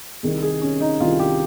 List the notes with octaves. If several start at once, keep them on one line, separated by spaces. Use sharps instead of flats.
C2 C3 D#3 G#4
G#4
C#4
D#4
C2 C3 D#3 F4
G4